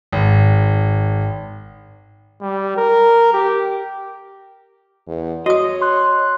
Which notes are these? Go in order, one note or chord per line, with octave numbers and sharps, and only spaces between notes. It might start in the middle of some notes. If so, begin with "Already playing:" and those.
G#1
G3
A#4
G4
E2
F#4 C#5 D#5 D#6
C6 F#6